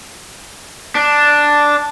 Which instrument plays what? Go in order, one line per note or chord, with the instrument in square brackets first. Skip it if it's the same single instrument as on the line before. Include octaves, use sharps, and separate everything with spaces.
[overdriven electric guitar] D4